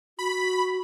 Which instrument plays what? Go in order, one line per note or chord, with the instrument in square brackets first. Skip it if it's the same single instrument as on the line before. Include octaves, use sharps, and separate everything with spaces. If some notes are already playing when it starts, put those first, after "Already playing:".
[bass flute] F#4 [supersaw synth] B5